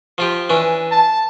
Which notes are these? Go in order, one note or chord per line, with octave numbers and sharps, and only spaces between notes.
F3 F4 G4
E3 C#4 D4
A5